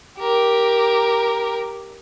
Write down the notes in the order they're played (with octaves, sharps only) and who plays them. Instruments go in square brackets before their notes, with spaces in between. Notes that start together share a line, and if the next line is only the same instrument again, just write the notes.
[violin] G4 A#4